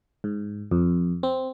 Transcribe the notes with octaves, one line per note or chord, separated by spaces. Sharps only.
G#2
F2
C4